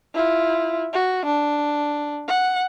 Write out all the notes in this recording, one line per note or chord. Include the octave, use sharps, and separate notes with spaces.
E4 F4
F#4
D4
F#5